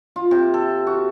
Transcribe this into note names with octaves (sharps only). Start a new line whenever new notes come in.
F4
C3
A4
F#4